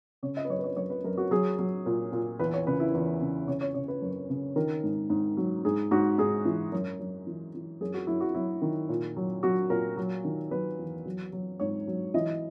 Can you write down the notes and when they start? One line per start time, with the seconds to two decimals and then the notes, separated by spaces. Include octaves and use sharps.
0.23 C#3 C#5
0.37 D#5
0.45 B4
0.49 F#2 C#5
0.59 B4
0.64 C#5
0.77 F#2 C#5
0.90 B4
1.04 F#2 A#4
1.18 F#4
1.31 F#3 G#4
1.59 F#3
1.86 A#2
2.12 A#2
2.39 E2 B4
2.54 C#5
2.67 C#3 B4
2.80 E4
2.94 E2
3.21 C#3
3.47 C#3 C#5
3.61 C#5
3.75 C#3 C#5
3.88 B4
4.02 F#2
4.30 C#3
4.56 D#3 A#4
4.83 G#2
5.10 G#2
5.37 F#3
5.65 G#2 G#4
5.91 G#2 F#4
6.18 G#2 G#4
6.45 E3
6.72 F#2
7.00 F#2
7.27 E3
7.54 E3
7.81 F#2 G#4
7.94 F#4
8.07 F#2 E4
8.20 F#4
8.35 F#3 E4
8.62 D#3
8.89 A#2
9.17 F#3
9.43 F#3 F#4
9.70 A#2 A#4
9.97 F#3
10.24 D#3
10.51 F#3 B4
10.79 E2
11.05 F#3
11.33 F#3
11.60 G#2 C#5
11.87 F#3
12.14 E3 D#5